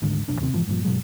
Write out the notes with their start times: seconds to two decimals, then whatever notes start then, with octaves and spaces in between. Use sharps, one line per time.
0.02 G#1 D2 G#2 D3
0.28 F1 B1 D4
0.40 D#2 C3 C4
0.53 F1 G#2 E3 F3
0.68 G2 A#2 E3 F3
0.85 G2 B2 F#3 G#3